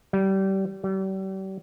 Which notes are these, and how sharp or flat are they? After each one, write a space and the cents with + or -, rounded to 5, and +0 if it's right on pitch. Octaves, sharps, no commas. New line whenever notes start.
G3 -25
G3 -40